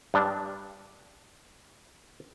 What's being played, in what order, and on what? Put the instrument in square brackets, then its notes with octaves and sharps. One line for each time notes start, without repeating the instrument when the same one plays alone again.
[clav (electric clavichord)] G2 D4